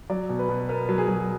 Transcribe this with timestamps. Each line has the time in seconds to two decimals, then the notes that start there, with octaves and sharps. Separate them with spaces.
0.10 F#3 D5
0.29 B2
0.39 B4
0.49 B2
0.69 B3 A#4
0.89 F#3
0.98 G#4
1.08 F#3